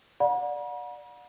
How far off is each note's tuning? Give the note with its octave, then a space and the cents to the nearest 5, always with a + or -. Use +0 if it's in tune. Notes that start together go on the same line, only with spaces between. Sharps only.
D5 +0 F#5 -35 B5 -45